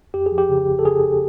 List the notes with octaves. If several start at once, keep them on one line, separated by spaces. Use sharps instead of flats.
F2 G4
G#4
F3
G4
C#3
G1
A4
C#3 G#4
C#3